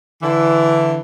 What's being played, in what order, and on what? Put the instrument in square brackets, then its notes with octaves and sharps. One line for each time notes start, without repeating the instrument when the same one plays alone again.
[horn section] D3 E3